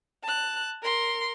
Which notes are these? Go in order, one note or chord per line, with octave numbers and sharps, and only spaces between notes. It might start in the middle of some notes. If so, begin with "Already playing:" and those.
A5 F#6
A#4 C6